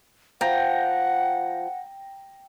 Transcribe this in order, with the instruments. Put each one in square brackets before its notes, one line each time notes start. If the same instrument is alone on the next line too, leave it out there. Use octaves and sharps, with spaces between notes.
[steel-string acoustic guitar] F3 [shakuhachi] F#5 [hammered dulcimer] G5 A#5